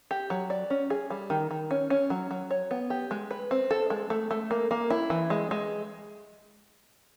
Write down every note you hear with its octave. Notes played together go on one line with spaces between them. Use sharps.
G4
F#3
D5
C#4
G#4
G3
D#3
D#3
C#4
C#4
F#3
F#3
C#5
B3
G4
G#3
B4
C4
A4
G#3
A3
A3
A#3
A#3
E4
E3
G#3
G#3